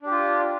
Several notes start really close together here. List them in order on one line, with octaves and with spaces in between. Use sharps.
D4 G4 F4